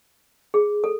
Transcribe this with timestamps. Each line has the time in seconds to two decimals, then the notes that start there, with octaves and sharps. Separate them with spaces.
0.54 G#4
0.84 A4